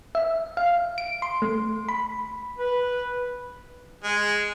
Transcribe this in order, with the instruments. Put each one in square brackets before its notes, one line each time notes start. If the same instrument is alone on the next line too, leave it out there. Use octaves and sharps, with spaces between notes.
[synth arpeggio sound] E5
F5
D7
C6
A3
B5
[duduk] B4
[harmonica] G#3